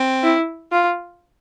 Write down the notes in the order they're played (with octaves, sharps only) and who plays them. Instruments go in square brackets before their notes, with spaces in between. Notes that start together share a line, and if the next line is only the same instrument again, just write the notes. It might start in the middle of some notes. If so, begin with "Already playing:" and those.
Already playing: [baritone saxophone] C4
[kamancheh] E4
F4